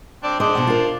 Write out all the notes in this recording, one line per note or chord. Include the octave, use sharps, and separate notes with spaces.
C4 D4 D5
D4 G#4 C5 D#5
B2 F#5
F4 A#4